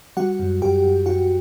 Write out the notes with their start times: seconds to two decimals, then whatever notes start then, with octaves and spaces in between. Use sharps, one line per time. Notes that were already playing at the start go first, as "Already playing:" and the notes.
0.17 G3 F#4 F#5
0.39 F#2
0.62 F#2 G4 G5
0.83 F#2
1.06 F#2 F#4 F#5